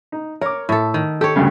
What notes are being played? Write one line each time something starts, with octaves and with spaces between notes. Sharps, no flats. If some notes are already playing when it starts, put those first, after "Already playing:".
D#4
A#4 C#5 D6
A2 A4 E5
D#3
G4 A4 C#5
D2 G2 C#3